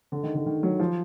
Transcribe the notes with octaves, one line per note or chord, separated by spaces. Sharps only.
D3
D#3
D3
D#3
F#3
F3